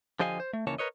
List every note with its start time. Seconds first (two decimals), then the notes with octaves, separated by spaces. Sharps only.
0.20 D3 F3 G4 D#5 F5 G#5
0.40 C5
0.53 A3
0.67 D#2 C#3 E3 A#3 C#5 A5
0.79 A#4 B4 C#5 D#5